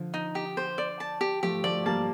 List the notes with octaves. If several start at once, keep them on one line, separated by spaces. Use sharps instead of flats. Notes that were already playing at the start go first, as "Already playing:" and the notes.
Already playing: D3 F3
D#4
G4
C5
D5
A5
G4
F3 A3 G4
F3 A3 D5
G3 A#3 A5